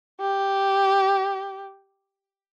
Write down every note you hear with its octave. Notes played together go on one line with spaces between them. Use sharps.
G4